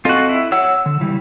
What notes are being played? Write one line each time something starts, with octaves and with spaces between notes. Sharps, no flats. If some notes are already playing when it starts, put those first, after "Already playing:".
C4 F4 F#4 A4 D#5
E4
C#5 F#5 E6
D3
C#3 E3 G3